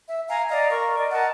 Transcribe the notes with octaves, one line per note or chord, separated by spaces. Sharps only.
E5
F5 G#5 A#5
D5 D#5 F5 A#5
A#4 C#6
D5 D#5
A#4 D#5 F#5 A5